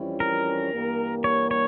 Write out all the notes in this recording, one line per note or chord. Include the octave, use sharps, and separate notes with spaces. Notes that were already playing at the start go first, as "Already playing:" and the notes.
Already playing: F2 E3 G3 C#4 E4
A#4
G2 E3 G3 A#3
C#5
C#5